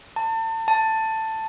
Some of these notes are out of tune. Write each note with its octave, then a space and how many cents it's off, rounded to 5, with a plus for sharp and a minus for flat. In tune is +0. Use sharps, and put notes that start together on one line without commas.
A5 +35
A5 +10